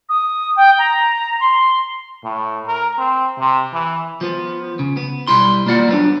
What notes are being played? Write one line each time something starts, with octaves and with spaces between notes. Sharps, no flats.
D#6
G5
A#5
C6
A2
A#4
C4
C3
E3
F3 B3
C#3
B3
B1 G3 E4 C6
A#3 F4 D5 F#5
F#3 B3 D4